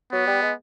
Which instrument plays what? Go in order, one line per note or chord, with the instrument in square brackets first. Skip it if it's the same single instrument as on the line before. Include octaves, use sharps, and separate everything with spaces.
[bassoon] F#3 [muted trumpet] B3
[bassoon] G3
G#3